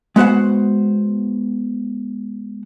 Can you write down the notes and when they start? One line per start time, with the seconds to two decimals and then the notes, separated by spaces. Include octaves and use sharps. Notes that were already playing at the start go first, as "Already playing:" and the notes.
0.16 G#3 B3 F#4 C5 F#5